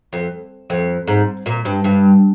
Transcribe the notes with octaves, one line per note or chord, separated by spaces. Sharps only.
F2
F2
G#2
A#2
G2
G2